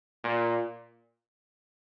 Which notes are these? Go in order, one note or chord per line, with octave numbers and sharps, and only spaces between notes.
A#2